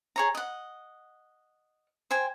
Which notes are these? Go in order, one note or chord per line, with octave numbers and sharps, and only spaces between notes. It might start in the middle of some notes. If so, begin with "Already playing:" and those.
G#4 C#5 A#5
D#5 F#5
C5 G5 G#5